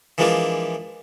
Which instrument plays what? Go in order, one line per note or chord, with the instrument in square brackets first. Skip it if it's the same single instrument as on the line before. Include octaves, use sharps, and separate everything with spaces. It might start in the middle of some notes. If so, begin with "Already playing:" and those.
[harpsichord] E3 F3 G#3 A#3 D4 F4